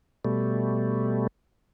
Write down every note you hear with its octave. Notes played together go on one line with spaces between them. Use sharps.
B2 G3 A3